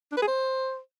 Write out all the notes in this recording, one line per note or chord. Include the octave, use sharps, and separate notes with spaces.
D4
B4
G#4
C5